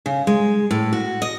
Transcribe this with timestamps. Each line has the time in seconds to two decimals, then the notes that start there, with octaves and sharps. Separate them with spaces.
0.06 C#3
0.27 G#3
0.71 A2
0.93 F#4
1.22 D#5